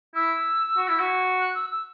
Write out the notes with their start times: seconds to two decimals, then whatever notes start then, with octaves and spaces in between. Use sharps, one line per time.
0.15 E4 E6
0.77 F#4
0.88 E4
0.99 F#4
1.39 F#6
1.55 E6
1.71 E6